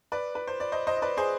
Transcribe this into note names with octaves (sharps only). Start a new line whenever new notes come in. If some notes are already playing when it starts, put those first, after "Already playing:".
B4 D5
B4
C5
D5
C5 D#5
C5 D#5
D#5
B4 D5
G#4 C5